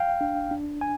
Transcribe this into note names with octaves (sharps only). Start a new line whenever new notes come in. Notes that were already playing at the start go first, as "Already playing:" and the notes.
Already playing: F5 G5
D4
D4
G#5